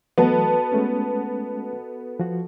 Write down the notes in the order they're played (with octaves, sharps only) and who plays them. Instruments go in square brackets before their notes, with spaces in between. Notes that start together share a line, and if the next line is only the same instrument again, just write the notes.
[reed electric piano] E3 F#3 A3 [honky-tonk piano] B3 [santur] F#4 A4 D#5
[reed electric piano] G#3 A3 C#4
F3 F#4